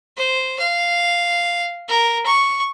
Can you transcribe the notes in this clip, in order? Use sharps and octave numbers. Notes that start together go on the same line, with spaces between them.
C5
F5
A#4
C#6